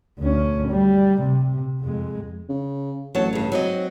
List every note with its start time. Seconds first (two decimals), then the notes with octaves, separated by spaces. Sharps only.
0.19 D2 C#4
0.69 G3
1.22 C3
1.82 F2 G#3
2.49 C#3
3.15 A1 F#3 C#5 A5
3.33 G2 C#3
3.52 G#2 F#3 C4 D#5